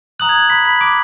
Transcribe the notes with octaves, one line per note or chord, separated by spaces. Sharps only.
A#5 D#6 F#6 F#7
G#6
B5 B6
B5 B6
D6 D7